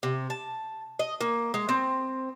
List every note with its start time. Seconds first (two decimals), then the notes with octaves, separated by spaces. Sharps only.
0.03 C3
0.30 A5
0.99 D#5
1.21 A#3
1.54 G#3
1.69 C4